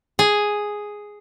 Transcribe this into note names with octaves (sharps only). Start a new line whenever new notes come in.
G#4